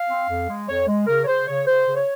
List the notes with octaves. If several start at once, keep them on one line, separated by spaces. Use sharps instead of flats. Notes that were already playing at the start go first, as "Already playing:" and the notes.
Already playing: F5
C4
F2
G#3
F2 C#5
G#3
C#3 A#4
C#5
C#3 C5
C#3 C#5
C#3 C5
C#3
C#5